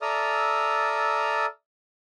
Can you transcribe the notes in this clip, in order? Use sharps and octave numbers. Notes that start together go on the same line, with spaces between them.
A4 D5 E5 A#5 D#6 F6